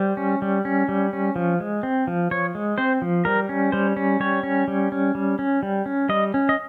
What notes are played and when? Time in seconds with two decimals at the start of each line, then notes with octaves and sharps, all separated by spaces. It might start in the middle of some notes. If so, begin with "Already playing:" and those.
Already playing: G3 C5
0.17 C#4
0.42 G3
0.65 C#4
0.89 G3
1.13 C#4
1.36 F3
1.60 G#3
1.83 C4
2.07 F3
2.31 F3 C#5
2.55 G#3
2.78 C4 C5
3.02 F3
3.25 G3 A#4
3.49 C#4
3.72 G3 C5
3.97 C#4
4.20 G3 C#5
4.43 C#4
4.68 G3
4.92 C#4
5.15 G3
5.39 C#4
5.63 G3
5.86 C#4
6.09 G3 D#5
6.34 C#4
6.49 D#5